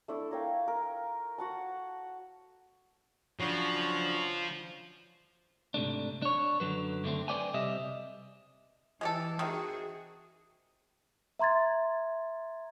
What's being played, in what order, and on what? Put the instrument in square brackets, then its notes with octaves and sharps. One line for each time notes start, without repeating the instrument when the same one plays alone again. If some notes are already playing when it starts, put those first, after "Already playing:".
[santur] A3 D4 E4
A#4 C#5 F5 G5
A#4
F#4 F#5 A5
[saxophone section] C#3 F#3 D4 [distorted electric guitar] F3
[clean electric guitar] G#2 C3 A3 D4
D4 C#5
F#2 D3 F#3 B4
F#2 D3 A3 C4
B4 C5 D5 G5 G#5
C3 G3 D#5 E5
[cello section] E3 [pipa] G#3 G4 A4
[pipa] C3 D#3 [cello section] F#4 G#4
[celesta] E5 A#5 C6 G#6 A6